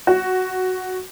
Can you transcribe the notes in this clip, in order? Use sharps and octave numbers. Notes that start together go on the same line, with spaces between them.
F#4